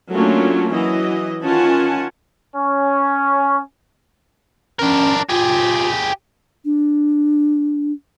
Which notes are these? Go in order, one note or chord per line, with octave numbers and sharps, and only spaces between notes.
F#3 A3 A#3 C#4 D4 F4
E3 F#3 D#5
D#3 C#4 F4 F#5 G#5 A5
C#4
C#4 D4 A#4
F4 G4 G#4
D4